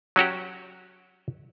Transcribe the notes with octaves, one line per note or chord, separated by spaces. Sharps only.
F#3 C#4 F#4 G4